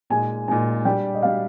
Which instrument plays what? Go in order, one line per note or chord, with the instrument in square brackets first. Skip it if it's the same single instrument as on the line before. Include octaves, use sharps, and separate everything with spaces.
[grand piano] A#2 G#3 D#4 [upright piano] G#5
[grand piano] A#2 G#3 D#4 [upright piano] G#5
[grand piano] G3 D4 G4 [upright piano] G5
[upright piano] D#5
[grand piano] G3 D4 G4 [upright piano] F5